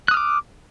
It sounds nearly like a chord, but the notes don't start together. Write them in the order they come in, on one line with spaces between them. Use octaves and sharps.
F#6 D#6 F6 D6